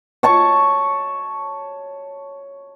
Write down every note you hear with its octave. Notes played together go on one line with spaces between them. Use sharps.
C#5 A5 C#6